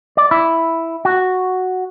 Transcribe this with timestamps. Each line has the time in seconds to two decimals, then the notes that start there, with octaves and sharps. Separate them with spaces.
0.17 D5
0.31 E4
1.05 F#4